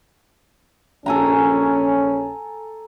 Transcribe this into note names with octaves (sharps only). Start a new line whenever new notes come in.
A#1 C#4 A4 G#5 A#5